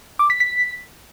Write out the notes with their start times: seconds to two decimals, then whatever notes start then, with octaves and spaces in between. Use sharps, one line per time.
0.19 D6
0.30 B6
0.40 B6